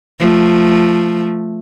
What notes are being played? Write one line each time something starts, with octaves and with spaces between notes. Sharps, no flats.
F3 A3